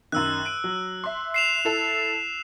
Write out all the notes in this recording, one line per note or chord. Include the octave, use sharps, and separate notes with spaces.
F#2 D#3 E6 F#6
D7 D#7
F#3
E5 C6
C7 E7 F7
E4 A4